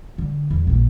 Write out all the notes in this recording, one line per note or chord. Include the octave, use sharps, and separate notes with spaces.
D3
E2
A#1 A#3